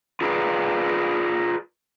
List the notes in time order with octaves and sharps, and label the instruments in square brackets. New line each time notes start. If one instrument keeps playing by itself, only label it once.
[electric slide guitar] F4 G#4 A#4 B4 D5 F5